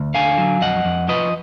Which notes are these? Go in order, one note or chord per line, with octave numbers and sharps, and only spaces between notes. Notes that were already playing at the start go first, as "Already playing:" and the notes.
Already playing: D2
D3 F5 G#5
F#3
F2 D#5 F#5
F2
F3 B4 D#5